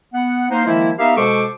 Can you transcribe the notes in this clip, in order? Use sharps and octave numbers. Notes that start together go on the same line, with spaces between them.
B3 F#5
A#3 D#4 C5
D#3 F3 G#3 A#3 E4
B3 D#4 G4 A#4 E5 F5
B2 G#3 A4 C5 C#6 D6